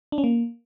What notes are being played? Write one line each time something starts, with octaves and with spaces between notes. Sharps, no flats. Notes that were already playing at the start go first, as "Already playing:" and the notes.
D4
C#4
A#3